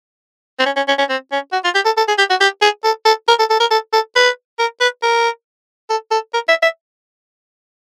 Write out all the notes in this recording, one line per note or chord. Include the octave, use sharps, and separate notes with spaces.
C4
C#4
C#4
C#4
C#4
C4
C#4
F#4
F4
G4
A4
A4
G#4
G4
F#4
G4
G#4
A4
A4
A#4
A4
A4
A#4
A4
A4
B4
A#4
B4
A#4
A4
A4
A#4
E5
E5